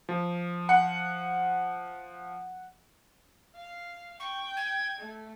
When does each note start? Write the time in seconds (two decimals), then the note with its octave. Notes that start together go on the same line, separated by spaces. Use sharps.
0.09 F3
0.69 F#5
3.56 F5
4.20 G5 C#6
4.57 G#6
4.99 A3